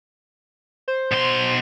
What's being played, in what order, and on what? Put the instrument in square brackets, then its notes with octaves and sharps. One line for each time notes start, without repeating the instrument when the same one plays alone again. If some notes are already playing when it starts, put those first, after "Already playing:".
[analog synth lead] C5
[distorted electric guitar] B2 C6